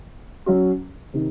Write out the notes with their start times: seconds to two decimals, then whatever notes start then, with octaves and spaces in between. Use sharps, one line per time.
0.46 F#3 C#4 F#4
1.14 C3 D#3